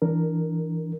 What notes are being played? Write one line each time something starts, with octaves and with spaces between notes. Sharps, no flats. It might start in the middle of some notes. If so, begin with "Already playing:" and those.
E3 D4 A#4